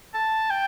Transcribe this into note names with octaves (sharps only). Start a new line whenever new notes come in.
A5
G5